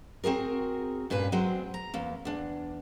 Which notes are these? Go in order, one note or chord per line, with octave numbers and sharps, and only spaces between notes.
C4 F#4 G#4 A#4
G2 A#2 C#4 B4
F#3 G#3 C4
A#5
E2 A#3
E2 D4